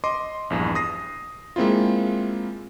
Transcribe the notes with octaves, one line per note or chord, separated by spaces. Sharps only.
D#5 C6 D6
A#1 E2 G2
D#6 A#6 C7
G#3 A#3 C4 E4 F4